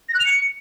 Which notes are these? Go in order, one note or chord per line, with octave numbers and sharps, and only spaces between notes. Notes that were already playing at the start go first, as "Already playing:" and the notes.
A#6
F#6
F7
C#7